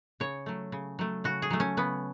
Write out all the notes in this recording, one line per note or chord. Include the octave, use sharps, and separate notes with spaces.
C#3 C#5
F#3 A3
C#3
F#3 A3
C#3 F#4
G#4
F#3 A3
C#4
C#3 B3